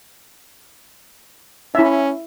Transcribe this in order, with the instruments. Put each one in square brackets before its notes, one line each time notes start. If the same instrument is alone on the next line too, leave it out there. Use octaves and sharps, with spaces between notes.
[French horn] C#4 [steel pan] E4 E5